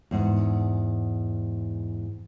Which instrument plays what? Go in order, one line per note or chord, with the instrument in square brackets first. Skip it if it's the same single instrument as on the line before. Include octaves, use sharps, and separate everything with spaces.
[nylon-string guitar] E2 G#2 F#5